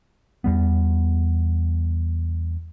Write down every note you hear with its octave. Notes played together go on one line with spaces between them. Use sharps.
E2 G3 B3